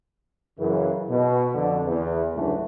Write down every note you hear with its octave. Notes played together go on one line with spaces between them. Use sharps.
F#2 C#3 E3
B2
F2 D3
E2
C#2 G#2 D3 E3 F#3 A3